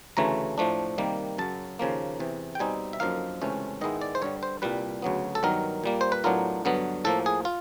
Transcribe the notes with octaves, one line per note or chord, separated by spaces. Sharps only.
D2 C#3 E3 A3 A#5
A2 F3 A3 D4
C3 D#3 G3 A#3
F#2 C#3 F#3 A5
D#2 C#3 F3 A#3
E2 C3 E3
G5
B2 G3 C4 D#4 G#5
E5
F#2 D3 F3 A#3 D#4 F5
C#2 C3 E3 A3 C#4
G#2 D#3 G#3 B3 E4 D#5
D5
C5
G2 D3 G3 C#5
C5
C2 A#2 G3 B4
D2 C#3 F#3 B3
A4
G2 D#3 F#3 B3 A#4
A#2 G3 A#3
C5
B4
A2 F#3 B3 D4 F4 A#4
G2 D3 F#3 B3
A2 F3 A#3 A4
G#4
F4